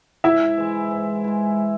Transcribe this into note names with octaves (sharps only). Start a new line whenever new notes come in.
G#2 E4 E5
E3 G#3
G#2
E3 G#3